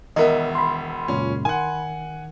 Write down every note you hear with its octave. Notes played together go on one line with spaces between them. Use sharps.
E1 D#3 B3 A#4 D#5 E5
B5 C6
C#2 F#2 A#2 C#4
D#3 F#5 G#5